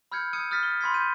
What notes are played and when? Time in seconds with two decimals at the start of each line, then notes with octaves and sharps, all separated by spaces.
0.12 B5 E6 F6 G6 G#6 C#7
0.33 D#6 E6 G6 G#6 C#7 D#7
0.51 D#6 F6 G6 A6 B6
0.63 G7
0.81 B5 C6 G#6 B6
0.94 G6 D#7